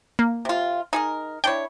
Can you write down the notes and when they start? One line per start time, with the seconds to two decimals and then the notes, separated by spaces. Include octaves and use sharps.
0.19 A#3
0.45 C3 F4
0.93 D#4 G#4 A#4
1.44 D4 E4 C#5 G5